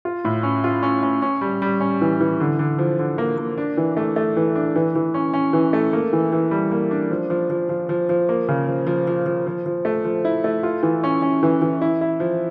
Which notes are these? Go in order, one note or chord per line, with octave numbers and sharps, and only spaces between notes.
F4
A2
C#4
F4
C#4
C#4
C#4
G3
G3
C#4
E3
E3
D3
D3
F3
D3
A#3
A#3
D4
E3
A3
A3
E3
D4
E3
E3
C#4
C#4
E3
A3
A#3
E3
E3
G3
A#3
D4
F3
F3
F3
F3
F3
F3
A#3
C#3
F3
F3
F3
F3
F3
F3
A3
F3
E4
A3
F4
E3
C#4
C#4
E3
E3
E4
E4
F3